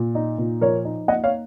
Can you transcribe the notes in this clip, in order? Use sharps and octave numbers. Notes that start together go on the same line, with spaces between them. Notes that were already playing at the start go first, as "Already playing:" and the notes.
Already playing: A#2
D#4
A#2
F3 A#4 C#5
D#4
A#3 D#5 F#5
C#5 F5